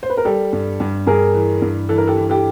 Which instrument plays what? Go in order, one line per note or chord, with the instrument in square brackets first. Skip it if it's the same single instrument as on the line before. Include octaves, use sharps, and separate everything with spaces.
[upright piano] C5
B4
A#4
[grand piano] G3 [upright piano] G4 A4
[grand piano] G2
G2
[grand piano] G2 [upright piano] G#4 A#4
[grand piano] E3
G2
[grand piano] E3 [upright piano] A4
[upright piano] A#4
G4 A4
[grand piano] E3
[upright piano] G4 A4